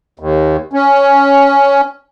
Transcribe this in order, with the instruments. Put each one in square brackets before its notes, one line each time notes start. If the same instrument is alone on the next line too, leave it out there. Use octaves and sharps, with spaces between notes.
[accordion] D#2
C#4